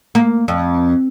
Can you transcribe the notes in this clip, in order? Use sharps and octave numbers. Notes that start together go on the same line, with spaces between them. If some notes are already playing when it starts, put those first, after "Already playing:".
A#3
F2